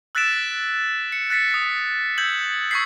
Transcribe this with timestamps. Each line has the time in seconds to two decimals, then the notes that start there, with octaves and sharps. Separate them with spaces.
0.15 E6 F#6 A6 B6 D7 E7
1.12 C#7
1.30 F#6 A6 B6 C#7
1.51 D#6 B6
2.18 E6 G6 G#6 F#7
2.71 C#6 E6 G#6 B6 C7